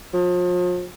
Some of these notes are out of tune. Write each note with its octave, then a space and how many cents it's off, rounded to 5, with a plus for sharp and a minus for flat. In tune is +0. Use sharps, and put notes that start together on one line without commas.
F3 +40